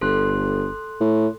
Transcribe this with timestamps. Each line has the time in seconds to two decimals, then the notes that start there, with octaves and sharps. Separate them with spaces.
0.01 G1 A4 C6 F#6
1.00 A2